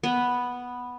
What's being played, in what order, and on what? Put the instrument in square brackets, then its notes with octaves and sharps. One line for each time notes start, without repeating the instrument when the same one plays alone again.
[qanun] B3